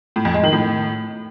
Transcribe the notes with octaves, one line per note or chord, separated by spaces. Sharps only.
A2
F2
G#3
D#3
A2